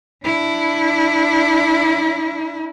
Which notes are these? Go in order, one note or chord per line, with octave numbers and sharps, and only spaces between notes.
D4 E4